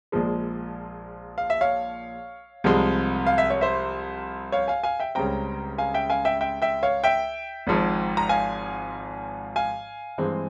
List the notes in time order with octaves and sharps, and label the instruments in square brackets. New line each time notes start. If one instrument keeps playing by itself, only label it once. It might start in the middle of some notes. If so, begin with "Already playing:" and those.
[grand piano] A#1 A#2 F3 G#3
F5
E5
C#5 F5
C2 C3 F3 G#3
F5
E5
C#5
C5 E5
C#5 F5
F5 G#5
F5 G#5
E5 G5
C#2 C#3 G3 C4 G5 A#5
F5 G#5
E5 G5
F5 G#5
E5 G5
E5 G5
E5 G5
C#5 F5
E5 G5
G#1 G#2 F3
A#5
F5 G#5
F5 G#5
G2 E3 G#3 C4